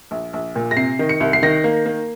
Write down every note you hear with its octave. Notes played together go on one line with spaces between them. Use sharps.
A#1
A#1
A#2
A#6
C3 C7
D#3
C#7
C2
C7
D#3 A#6
A#3
A#3